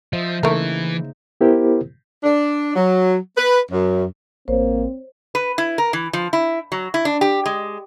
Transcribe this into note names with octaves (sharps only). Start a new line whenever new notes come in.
F3 C5 D#5 E5
C#3 E3 A3 A#3 D#4 A#4
B3 E4 G4 A#4 C5
D4
F#3
B4
F#2
A1 A#3 C4 C5 C#5
B4
E4
A#4
E3
F3
E4
F#3
E4
D4
G4
G#3